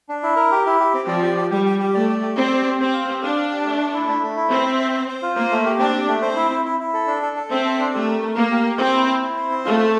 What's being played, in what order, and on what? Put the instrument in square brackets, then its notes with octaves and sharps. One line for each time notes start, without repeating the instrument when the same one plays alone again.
[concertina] D4
E4
A#4
G4
E4
G4
C4
[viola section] F3 [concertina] D5
[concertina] G4
G4
[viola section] G3 [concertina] G4
[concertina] G4
G4
[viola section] A3 [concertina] D5
[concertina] D5
G4
[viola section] C4 [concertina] D5
[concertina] G4
G4
[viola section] C4 [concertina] G4
[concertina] F5
G4
[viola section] D4 [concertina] F5
[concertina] F5
G4
A3
A4
E4
A3
A3
E4
[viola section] C4 [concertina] E5
[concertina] E5
C5
C5
C5
F4
[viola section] A#3 [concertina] C5
[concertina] A3
G4
[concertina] C4 [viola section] D4
[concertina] G4
A3
[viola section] C4 [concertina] C5
[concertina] E4
E4
E4
E4
A4
D4
A4
A4
[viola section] C4 [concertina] E5
[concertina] A4
D4
[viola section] A3 [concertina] G4
[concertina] A#4
A#4
[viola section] A#3 [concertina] F5
[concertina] G4
G4
[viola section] C4 [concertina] C5
[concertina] E4
E4
E4
C5
C4
[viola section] A3 [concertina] F4
[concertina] C5